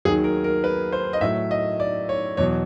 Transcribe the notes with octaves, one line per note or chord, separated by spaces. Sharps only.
D#2 D#3 F#3 G#4
A#4
A#4
B4
C5
D#5
A2 F#3 E5
D#5
D5
C#5
E2 B2 F#3 C#5